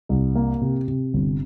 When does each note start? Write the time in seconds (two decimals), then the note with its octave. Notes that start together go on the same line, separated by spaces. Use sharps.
0.09 C2
0.35 A#3
0.61 C3
0.88 C3
1.14 G1